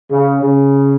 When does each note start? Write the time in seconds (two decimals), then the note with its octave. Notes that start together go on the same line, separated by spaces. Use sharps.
0.10 C#3
0.42 C#3